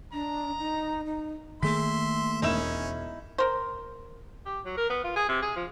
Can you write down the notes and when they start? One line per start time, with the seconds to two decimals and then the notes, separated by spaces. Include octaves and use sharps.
0.13 D4 D#5 A#5
0.60 D#4
1.05 D#4
1.63 D#3 A3 A#3 G#4 E5 C6 B6
2.42 E1 C#4 D#4 E4 E7
3.38 A#4 C5
4.45 G4
4.65 F#3
4.77 A#4
4.90 B3
5.04 F4
5.16 G#4
5.29 C3
5.42 G#4
5.56 F3